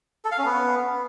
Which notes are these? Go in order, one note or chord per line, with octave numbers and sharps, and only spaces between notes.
A4
F5
C#4
B3